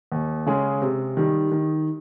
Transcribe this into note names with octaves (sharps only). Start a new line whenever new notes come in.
D#2
C#3 G#3 C#4 G#4
C3
D#3 G3
D#3